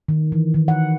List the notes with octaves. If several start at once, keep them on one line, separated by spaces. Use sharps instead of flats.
D#3
E3
D#3
F#5